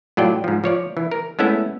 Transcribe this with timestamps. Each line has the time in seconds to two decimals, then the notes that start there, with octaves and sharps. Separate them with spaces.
0.17 A2 F#3 F4 D5 G5
0.44 G#2 F3
0.64 F3 C#5 D5
0.97 E3
1.11 A#4
1.39 G#3 A3 B3 C#4 E4 E5